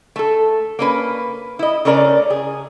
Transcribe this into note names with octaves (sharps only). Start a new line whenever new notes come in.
A3 A4
A#3 C#4 B4
E4 D#5
C#3 A3 C#4 A#4 D5
G#4